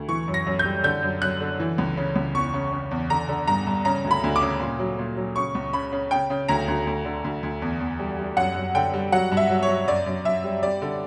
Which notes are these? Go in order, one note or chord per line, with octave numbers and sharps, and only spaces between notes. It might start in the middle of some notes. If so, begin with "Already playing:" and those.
Already playing: D2
E3 C#6
F#2
A#6
F#2
G6
G3
D3 G6
F#2
F#2 F#6
D3
E3
C#2
C#3
C#2
E2 C#6
C#3
C#3
E2
D3 A#5
D3
G2 A#5
G2
C#3 A#5
D2
B5
D2
D6
C#3
A#2
F#3
A#2
F#3
C#3 C#6
C#2
C#3 B5
C#3
C#3 G5
C#3
D2 A#5
D2
D2
D3
D2
D2
E2
E2
G3
G3
F#2 F#5
F#2
D3 G5
G3
F#3 F#5
G2
E5
F#3
C#5
F#3
F#2 D5
F#2
F#2 E5
G3
G3 D5
D3